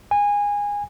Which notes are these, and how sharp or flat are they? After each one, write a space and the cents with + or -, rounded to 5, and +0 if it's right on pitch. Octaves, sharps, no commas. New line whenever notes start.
G#5 -20